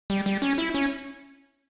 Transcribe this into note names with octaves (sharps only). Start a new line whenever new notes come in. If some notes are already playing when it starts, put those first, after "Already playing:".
G3
G3
C#4
E4
C#4